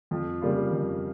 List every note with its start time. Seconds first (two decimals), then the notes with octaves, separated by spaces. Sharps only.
0.11 F2
0.41 C#3 G3 A#3 F4
0.72 F2